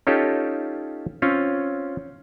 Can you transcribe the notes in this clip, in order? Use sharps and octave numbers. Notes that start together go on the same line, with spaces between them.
C#4 D#4 F4 G4 A4 C#5
C4 C#4 F4 C#5